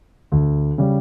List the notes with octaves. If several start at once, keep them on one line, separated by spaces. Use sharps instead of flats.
D2
C#3 G3